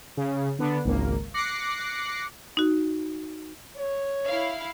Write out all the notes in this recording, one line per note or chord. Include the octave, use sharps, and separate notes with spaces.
C#3
D3 B3 D4
G#1 C#2 A#3
D6 F#6 A#6 C7 C#7
D#4 F#4
C#5
E4 F5